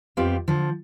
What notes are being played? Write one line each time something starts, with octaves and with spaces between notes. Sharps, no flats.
F2 B3 C4 F4 G4 F5
D3 F3